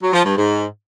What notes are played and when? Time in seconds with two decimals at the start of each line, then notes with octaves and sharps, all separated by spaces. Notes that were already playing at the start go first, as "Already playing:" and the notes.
0.01 F#3
0.13 F3
0.24 G2
0.36 G#2